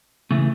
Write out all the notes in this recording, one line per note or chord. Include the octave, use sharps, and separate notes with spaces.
C#3 E3 A3